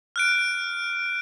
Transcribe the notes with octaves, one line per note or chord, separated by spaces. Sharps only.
F6 F#6 D7